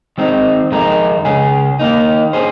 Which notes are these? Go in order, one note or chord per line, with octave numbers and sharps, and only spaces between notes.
D#3 G#3 C4 D#4
F2 D#3 G#3 D#4 A#4
C#2 C#3 G#3 C#4 G#4
D#3 A#3 D#4
C#4 G#4 C5